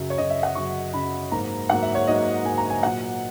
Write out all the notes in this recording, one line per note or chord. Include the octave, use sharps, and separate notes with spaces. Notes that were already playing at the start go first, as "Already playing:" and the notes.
Already playing: F#2 C#3 F#3
C#5
F#2 C#3 F#3 D#5
E5
F#5
F#2 C#3 F#3 C#6
F#2 C#3 F#3 B5
G#2 F#3 A#3 A#5
G#2 F#3 A#3 F#5
E5
C#5
G#2 F#3 A#3 D#5
G#2 F#3 A#3 G#5
A#5
G#5
A#2 F#3 A#3 F#5